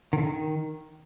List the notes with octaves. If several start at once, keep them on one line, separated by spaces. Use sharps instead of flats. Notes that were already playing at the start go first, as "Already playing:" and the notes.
D#3
D3
D#3